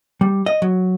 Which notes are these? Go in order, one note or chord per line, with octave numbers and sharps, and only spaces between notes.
G3
D#5
F#3